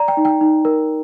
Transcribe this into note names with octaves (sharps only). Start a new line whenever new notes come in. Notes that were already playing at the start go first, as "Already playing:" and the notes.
Already playing: D5 A#5
G5
D#4
G5
D#4
A#4